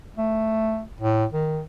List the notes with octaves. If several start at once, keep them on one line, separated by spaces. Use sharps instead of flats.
A3
A2
D#3